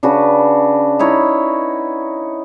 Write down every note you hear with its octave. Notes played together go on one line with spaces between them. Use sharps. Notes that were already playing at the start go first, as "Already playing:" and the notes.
C#3 D4 F#4 B4
D#4 E4 C#5